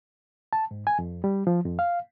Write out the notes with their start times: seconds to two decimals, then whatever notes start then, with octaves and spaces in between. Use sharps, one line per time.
0.53 A5
0.71 G#2
0.87 G#5
0.99 F2
1.24 G3
1.47 F3
1.65 F2
1.79 F5